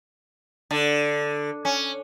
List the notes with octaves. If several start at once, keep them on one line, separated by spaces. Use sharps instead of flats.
D3
C#4